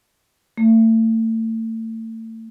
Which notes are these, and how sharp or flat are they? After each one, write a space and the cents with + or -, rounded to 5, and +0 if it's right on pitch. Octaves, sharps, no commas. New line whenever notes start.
A3 +35